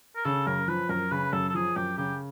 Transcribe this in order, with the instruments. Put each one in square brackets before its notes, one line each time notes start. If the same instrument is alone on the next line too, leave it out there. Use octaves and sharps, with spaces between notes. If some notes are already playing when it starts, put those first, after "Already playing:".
[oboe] A#4
[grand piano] C#3 [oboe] A4
[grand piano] F#2 [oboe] A#4
[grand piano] F3 [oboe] B4
[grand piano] F#2 [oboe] A#4
[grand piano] C#3 [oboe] B4
[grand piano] F#2 [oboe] A4
[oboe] A4
[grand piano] F3 [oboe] G#4
[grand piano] F#2 [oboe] G4
[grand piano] C#3 [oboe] G4